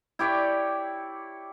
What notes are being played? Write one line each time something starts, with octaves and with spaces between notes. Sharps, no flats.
E4 G4 C#5 D5